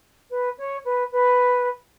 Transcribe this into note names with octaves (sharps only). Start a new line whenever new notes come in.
B4
C#5
B4
B4